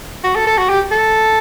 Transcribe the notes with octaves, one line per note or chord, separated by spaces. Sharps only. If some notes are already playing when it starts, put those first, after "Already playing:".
F#4
A4
A4
F#4
G4
A4